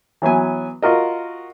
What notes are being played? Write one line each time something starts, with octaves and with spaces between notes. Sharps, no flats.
E3 F#3 B3 G#5
F4 F#4 A#4 D#5